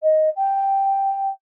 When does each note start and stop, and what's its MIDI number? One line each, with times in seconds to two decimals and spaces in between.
0.02 0.29 75
0.36 1.27 79